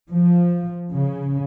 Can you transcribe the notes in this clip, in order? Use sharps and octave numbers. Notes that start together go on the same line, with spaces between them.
F3
C#3